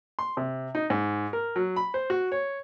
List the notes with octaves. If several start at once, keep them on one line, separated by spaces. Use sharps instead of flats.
C6
C3
D#4
G#2
A#4
F#3
B5
C5
F#4
C#5